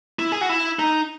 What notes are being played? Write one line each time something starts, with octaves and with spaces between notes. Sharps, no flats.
E4
G#4
F#4
E4
D#4